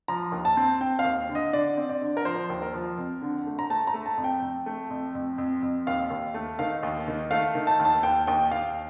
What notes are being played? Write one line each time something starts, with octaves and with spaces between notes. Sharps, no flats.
F3 A#5
D#2
A5
C4
C4 G5
F5
D#2
D3
D#5
D3 D5
C4
D5
D3
A#4
F3 C5
D#2
A#4
F3
F2
D3
A3
A#5
A3 A5
A#5
A3
A5
F2
G5
F2
A3
F2
F2
F2
F2
D#2 F5
D#2
A3
D#3 F5
D#2
D#3
A3 F5
D#3
A5
D#2
A5
D#2 G5
D#2 G5
D#2 F5